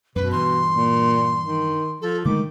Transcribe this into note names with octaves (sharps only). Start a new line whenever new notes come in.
F#2 B2 B4
G2 E3 C6
A#2
D#3
F3 A4
D3 D#3 G#3 A3 D6